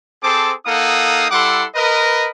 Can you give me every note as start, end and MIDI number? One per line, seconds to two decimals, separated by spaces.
0.22 0.53 60
0.22 0.53 68
0.22 0.53 69
0.22 0.53 72
0.22 0.53 81
0.22 0.53 86
0.66 1.27 58
0.66 1.27 63
0.66 1.27 69
0.66 1.27 77
0.66 1.27 78
0.66 1.27 87
1.31 1.65 55
1.31 1.65 64
1.31 1.65 69
1.31 1.65 78
1.31 1.65 84
1.31 1.65 86
1.75 2.29 70
1.75 2.29 71
1.75 2.29 75